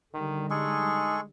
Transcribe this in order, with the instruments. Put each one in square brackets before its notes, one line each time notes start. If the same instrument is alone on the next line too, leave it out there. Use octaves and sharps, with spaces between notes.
[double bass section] D3 G3 [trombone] D#3
[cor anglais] G#3 [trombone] D#4 [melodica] G#4 A4 C#6